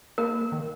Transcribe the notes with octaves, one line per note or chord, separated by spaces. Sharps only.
A#3 A#4
D#3